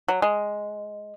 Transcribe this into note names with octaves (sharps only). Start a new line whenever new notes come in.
F#3
G#3